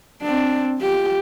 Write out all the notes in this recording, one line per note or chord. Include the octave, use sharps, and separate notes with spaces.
C4 D4
F4 G4